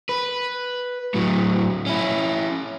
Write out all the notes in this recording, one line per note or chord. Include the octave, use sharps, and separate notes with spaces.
B4
A2 F#3
C#4 E4